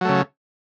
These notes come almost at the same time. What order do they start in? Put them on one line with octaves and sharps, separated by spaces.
F#3 A3 C#3